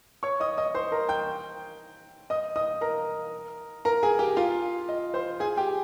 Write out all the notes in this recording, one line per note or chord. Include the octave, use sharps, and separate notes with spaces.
C#5 C#6
D#5 D#6
D#5 D#6
C5 C6
A#4 A#5
G5 G6
D#5 D#6
D#5 D#6
A#4 A#5
A#4 A#5
G#4 G#5
G4 G5
F4 F5
D#5
C5 C6
G#4 G#5
G4 G5